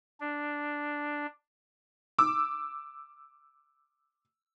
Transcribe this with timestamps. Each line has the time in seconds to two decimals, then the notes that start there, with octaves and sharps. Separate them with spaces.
0.20 D4
2.18 D6 E6